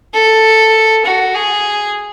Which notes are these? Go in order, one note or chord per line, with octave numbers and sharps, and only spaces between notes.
A4
F#4
G#4